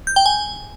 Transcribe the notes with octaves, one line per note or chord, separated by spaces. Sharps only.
G6
G5
G#5